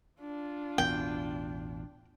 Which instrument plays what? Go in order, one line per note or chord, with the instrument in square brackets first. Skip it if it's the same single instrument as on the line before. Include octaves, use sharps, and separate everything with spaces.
[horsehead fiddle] D4 F4
[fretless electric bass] A1 E2 B2 [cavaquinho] G5